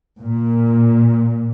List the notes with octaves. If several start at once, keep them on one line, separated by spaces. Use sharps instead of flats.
A#2